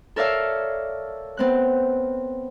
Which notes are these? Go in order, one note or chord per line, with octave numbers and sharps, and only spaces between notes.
A4 A#4 C#5 D5 E5 F5
B3 C4 F#6